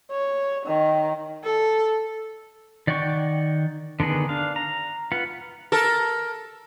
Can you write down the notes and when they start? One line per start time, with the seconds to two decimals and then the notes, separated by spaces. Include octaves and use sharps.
0.11 C#5
0.66 D#3
1.44 A4
2.87 D#3 D5 F#5 G5 C#6
4.00 D3 D#3 B3 G#4
4.29 D4 F5
4.56 A#5
5.12 F4 B4 F#5
5.72 A4 A#4